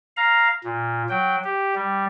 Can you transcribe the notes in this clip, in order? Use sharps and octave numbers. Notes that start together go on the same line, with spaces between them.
F5 A#5
A#2
F#3 G5
G4
G3